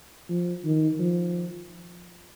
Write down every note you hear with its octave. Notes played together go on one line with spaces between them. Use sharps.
F3
D#3
F3